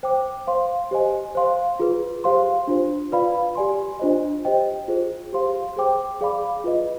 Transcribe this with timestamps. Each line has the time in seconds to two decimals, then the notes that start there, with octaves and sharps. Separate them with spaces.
0.03 C5 G5 D6
0.47 C5 F5 C6
0.91 G4 C5 D#5 G#5
1.35 C5 F5 C6
1.79 F4 G#4 B4
2.24 G4 C5 F5 C6
2.67 D4 F4 C5
3.12 F4 B4 D5 F5 B5
3.55 G4 D5 G#5 C6
4.00 D4 F4 C5 D#5
4.45 G4 C5 D#5 G5
4.88 F4 G#4 C5
5.33 G4 C5 F5 C6
5.76 G#4 C5 G5 D6
6.21 G#4 D5 F5 B5 D6
6.64 F4 B4 D#5